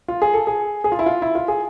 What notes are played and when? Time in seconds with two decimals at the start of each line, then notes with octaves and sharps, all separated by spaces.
0.08 F4
0.22 G#4
0.33 A4
0.47 G#4
0.84 G#4
0.92 F4
0.99 E4
1.06 F4
1.22 E4
1.35 F4
1.48 G#4